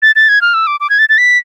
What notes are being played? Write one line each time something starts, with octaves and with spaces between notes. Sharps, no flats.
A6
A6
G#6
F6
E6
D6
D6
G#6
A6
A6
B6